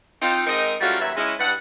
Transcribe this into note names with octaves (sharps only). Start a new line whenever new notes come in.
C4 D#4 F4
G#2 C4 D#4 A#4 D#5
F#3 G3 A3 C#4 F4 F#4
D#2 F#3 B4 E5
G#3 C#4 E4
G2 G3 B4 F#5